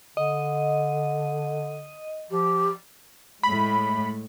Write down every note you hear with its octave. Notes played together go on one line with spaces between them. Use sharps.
D3 D#5
F3 G4
A2 G#3 B5